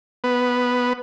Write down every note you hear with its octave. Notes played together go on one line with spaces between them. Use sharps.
B3